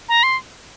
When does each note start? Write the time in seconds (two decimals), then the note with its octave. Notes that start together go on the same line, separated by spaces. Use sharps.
0.09 A#5
0.23 C6